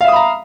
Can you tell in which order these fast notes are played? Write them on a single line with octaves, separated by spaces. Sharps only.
F5 E5 D#6 B5 A#5